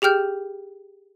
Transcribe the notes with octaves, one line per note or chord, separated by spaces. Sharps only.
G4 G#4 G5 F6 G6